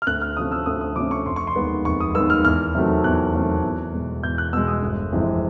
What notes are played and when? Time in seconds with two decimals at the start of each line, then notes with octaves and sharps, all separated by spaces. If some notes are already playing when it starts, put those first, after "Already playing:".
0.02 F6
0.07 D2 F#6
0.22 F6
0.36 C3 F3 A3 C#4 D#6
0.52 E6
0.66 D2 D#6
0.81 D#6
0.96 C3 F3 A3 C#4 D6
1.11 C#6
1.26 F1 C6
1.36 C#6
1.47 C6
1.56 D#2 D#3 G#3 B3
1.85 F1 C#6
2.00 D#6
2.15 D#2 D#3 G#3 B3 E6
2.30 F6
2.45 E2 F6
2.75 C3 D#3 F#3 A3
3.04 E2 F#6
3.33 C3 D#3 F#3 A3
3.63 E2
3.94 B2 G#3
4.23 E2 G6
4.38 F#6
4.53 B2 E6
4.57 G#3
4.68 D#6
4.82 G1
5.12 F2 C3 E3 G#3